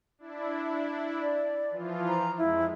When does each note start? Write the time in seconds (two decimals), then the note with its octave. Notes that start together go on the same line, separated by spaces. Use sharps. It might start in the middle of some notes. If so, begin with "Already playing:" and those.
0.19 D4 E4
1.22 D5
1.70 E3 F3 F4
2.08 A#5
2.38 F2 G#3 E4